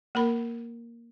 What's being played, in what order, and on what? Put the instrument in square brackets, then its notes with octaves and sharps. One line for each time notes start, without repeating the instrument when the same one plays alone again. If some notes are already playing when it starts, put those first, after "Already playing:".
[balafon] A#3 A#4 B5